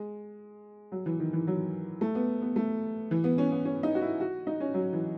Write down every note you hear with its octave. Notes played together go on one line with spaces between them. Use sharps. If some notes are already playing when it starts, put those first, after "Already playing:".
Already playing: G#3
F#3
E3
D#3
E3
F#3
A3
B3
B3
A3
E3
B3
C#4
B3
C#4
D#4
F#4
E4
F#4
D#4
C#4
F#3
E3